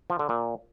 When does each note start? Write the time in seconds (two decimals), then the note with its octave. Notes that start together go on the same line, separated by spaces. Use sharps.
0.10 F3
0.19 D3
0.29 A#2